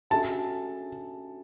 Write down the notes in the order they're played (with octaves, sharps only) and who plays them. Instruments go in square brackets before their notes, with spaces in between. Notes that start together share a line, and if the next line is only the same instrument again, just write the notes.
[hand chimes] C#4 F#4 A4 E5 G#5 [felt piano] A5